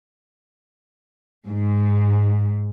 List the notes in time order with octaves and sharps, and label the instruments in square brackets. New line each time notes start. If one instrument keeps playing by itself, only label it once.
[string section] G#2